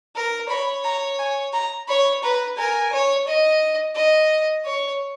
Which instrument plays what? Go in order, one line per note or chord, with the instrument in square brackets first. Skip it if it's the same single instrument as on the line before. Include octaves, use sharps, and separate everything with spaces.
[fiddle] A#4
[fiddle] C#5 [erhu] B5
[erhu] A#5
G#5
A#5
[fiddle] C#5 [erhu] B5
[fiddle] B4 [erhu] A#5
[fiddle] A#4 [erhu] G#5
[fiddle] C#5
D#5
D#5
C#5